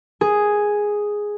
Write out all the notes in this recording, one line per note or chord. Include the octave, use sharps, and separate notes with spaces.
G#4